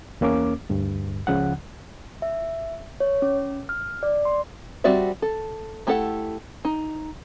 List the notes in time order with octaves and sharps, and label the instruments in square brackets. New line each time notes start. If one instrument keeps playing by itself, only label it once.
[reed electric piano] E2 A#3 C#4 D6
D2 G2
C#2 C#3 F3 F#5
[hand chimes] E5
C#5
C#4
F6
D5
C6
[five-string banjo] G3 C4 F#4 D5 E5
A4
A3 E4 G4 A4 F#5
D#4